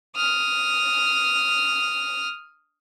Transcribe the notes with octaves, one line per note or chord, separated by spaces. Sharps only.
D#6 F6